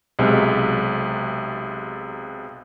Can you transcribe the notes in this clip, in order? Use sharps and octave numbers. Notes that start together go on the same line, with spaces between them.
B1 C3 G#3